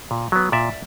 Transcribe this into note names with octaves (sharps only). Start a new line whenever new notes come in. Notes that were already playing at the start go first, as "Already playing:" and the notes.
A#2
F#3 B3
A#2 D5 E5